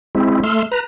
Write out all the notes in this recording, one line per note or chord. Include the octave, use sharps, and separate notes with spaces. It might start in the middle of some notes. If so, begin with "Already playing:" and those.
G#3 C4 E4
A3 C6 E6 F6
B4 A#5